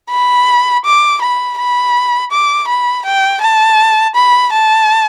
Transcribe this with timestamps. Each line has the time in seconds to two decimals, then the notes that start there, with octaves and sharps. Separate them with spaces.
0.11 B5
0.85 D6
1.22 B5
1.58 B5
2.31 D6
2.67 B5
3.05 G5
3.41 A5
4.15 B5
4.52 A5